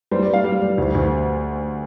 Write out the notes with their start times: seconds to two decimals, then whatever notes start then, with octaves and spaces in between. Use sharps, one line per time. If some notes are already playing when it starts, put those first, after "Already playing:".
0.11 G3 C5
0.23 D5
0.28 G3
0.33 F5
0.44 G3
0.62 G3
0.78 D2
0.95 D2